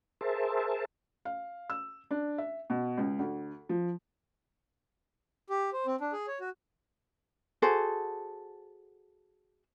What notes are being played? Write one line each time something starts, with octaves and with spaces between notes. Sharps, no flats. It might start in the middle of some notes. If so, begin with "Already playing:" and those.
G#4 A#4 C5 E5 A5
F5
E6
D4
E5
B2
C#2
D2
F3
G4
C5
C4
D4
G#4
C#5
F#4
F#4 G#4 A4 C5